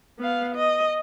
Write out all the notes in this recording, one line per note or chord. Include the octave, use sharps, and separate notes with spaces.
B3 F5
D#5